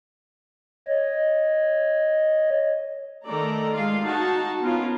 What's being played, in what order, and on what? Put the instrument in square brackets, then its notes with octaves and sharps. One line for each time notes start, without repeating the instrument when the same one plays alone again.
[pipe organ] C#5 D#5
[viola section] D#3 A3 A4 D5 A#5
G#3 F4 F5
D#4 F#4 A5
B3 C#4 F4 A#4